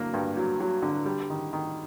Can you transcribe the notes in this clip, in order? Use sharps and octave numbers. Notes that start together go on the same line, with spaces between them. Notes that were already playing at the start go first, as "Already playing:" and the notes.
Already playing: D3 F#3 A#3
G2
F#3
F#3
D3
G3
D#3
D#3